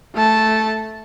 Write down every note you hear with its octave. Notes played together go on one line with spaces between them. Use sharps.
A3 A5